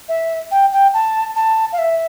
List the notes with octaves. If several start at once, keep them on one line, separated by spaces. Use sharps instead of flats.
E5
G5
G5
A5
A5
F5
E5